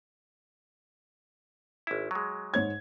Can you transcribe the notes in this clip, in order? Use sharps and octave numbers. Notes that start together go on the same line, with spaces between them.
G#1 E4
F#3 G#3
G#2 C#5 G#6